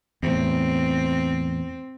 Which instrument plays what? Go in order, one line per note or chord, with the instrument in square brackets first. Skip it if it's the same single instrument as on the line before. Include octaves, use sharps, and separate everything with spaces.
[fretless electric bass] E2 A2 [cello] C4